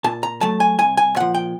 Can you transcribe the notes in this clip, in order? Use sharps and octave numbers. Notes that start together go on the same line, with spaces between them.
A#2 A5
A#5
F#3 A3 A5
G#5
C2 G#5
G#5
A#2 F3 F#5
G5